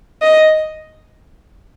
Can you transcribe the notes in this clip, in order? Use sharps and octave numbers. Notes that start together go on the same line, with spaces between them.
D#5